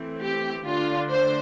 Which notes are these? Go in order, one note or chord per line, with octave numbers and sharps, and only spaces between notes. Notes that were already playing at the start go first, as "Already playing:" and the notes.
Already playing: E3 A3 C4
G4
D3 A3 D4 F4
C5